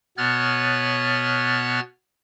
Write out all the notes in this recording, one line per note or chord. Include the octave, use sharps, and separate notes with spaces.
B2 B3 C#5 F6 F#6 A6